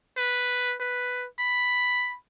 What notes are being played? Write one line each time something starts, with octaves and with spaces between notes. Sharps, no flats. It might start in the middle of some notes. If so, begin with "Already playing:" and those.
B4
B4
B5